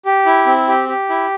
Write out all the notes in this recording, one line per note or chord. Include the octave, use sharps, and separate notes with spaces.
G4
E4
C4
G4
G4
E4